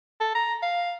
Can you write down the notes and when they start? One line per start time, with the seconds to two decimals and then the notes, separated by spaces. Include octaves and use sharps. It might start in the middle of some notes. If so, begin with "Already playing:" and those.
0.21 A4
0.35 A#5
0.63 F5